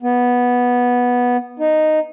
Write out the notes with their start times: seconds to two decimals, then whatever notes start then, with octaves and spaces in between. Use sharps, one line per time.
0.03 B3
1.59 D#4